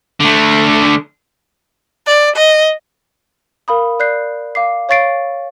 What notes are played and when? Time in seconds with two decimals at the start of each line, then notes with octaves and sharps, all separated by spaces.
0.20 D3 A3
2.07 D5
2.36 D#5
3.68 A#4 F5 B5 D#6
4.00 D5 F#6 G6 C7
4.55 F5 D6 C7
4.89 C#5 F5 C#6 A6 C7 D7